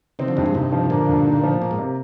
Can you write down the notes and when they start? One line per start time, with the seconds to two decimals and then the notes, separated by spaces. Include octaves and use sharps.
0.19 C3 D#3 C4
0.28 D3 F3
0.37 G2 D#3 G3
0.46 F3 G#3
0.54 G2 C3 D#3
0.72 F3
0.90 A#2 D3 A#3
1.09 G2
1.26 D#4
1.43 F3
1.61 A#2 A#3
1.71 G#2
1.79 C3